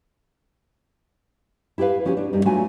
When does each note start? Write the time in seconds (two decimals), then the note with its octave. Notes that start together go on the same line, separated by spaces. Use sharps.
1.78 E4 G4 G#4 B4 F5
2.05 F3 C#4 F#4 G4
2.17 D4
2.33 F#2 G3 D#4
2.45 F#3 A3 D4 F4 F#4 G#5